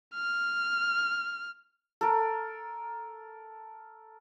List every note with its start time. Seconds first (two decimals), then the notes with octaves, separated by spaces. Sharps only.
0.15 F6
2.01 A4 A#4